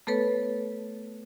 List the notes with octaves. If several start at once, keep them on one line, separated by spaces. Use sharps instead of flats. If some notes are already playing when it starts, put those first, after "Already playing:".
A3 B3 A4 B4 C#5